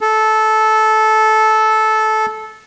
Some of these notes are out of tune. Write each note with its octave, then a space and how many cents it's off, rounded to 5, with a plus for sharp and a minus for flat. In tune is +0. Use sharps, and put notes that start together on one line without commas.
A4 -15